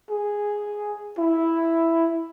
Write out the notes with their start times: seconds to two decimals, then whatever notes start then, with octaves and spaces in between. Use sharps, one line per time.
0.10 G#4
1.18 E4